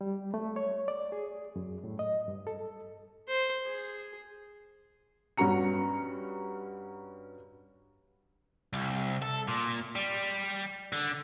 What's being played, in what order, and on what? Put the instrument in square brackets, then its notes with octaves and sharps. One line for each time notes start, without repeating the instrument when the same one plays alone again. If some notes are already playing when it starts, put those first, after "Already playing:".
[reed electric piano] G3
A3
C#5
D5
G#4
F#2
A2
D#5
G2
A4
[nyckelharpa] C5
G#4
[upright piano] G2 G3 C#4 F#4 A#5 C#7
[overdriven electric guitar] C2
A4
A#2
G3
D3